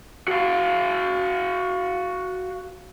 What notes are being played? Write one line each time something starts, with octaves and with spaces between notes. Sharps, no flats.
F#4 F5